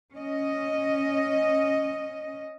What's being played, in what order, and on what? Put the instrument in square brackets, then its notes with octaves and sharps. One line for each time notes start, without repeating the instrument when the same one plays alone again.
[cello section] C#4 D#5